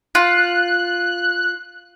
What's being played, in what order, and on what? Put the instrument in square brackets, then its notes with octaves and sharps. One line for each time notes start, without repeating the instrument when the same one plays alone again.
[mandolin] F4 [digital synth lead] F#6